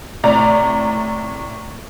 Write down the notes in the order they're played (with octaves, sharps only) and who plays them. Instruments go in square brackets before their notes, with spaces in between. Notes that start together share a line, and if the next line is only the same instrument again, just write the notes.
[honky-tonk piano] A2 C3 D5 A#5